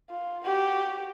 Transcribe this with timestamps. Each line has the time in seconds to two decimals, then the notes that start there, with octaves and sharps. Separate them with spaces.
0.10 F4
0.45 F#4 G4